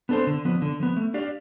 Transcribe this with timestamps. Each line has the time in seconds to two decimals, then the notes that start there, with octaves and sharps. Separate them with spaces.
0.09 B3 D4 A4 C5
0.27 D3
0.45 F3 B3
0.62 D3
0.80 F3 B3
0.96 A3
1.14 D4 G4 D5 F5